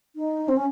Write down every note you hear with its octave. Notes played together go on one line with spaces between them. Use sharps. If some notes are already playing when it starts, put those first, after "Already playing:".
D#4
C4
C#4